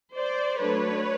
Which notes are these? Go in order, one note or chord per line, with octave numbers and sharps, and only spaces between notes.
C5 D5
F#3 A3 D4 B4 C#5